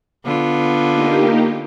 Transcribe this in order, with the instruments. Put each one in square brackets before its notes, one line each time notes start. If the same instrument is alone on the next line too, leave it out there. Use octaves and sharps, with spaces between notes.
[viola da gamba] D3 B3 F4
[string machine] A#3 D#4 G4